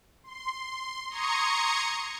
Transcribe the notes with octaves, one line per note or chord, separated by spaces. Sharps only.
C6
A#5 C6 C#6 D#6 G#6 C#7